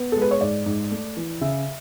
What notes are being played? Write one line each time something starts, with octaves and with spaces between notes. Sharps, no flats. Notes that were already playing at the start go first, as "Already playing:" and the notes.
Already playing: B3
G#3 A4
B4
C#5
G#2 D5
G#2
A3
E3
C#3 E5